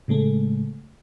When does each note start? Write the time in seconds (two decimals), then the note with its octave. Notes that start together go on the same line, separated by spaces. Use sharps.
0.08 A2 C#3 G#3 A3